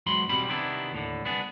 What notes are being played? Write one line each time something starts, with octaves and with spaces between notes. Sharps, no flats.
E2 G#2 F#3 B5 C6
B1 B2 G3 C4 G4 B5
C3 D#3 B3 D4 E4
D#2 A2 D3
C2 B3 D4 G#4